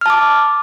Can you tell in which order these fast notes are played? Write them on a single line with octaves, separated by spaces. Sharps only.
F6 A5 D6